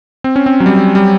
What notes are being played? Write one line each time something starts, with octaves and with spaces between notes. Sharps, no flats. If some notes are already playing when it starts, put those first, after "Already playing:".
C4
C#4
C4
F#3
G3
G3